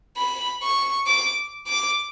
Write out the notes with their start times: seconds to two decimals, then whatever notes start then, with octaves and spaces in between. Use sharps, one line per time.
0.17 B5
0.62 C#6
1.07 D6
1.67 D6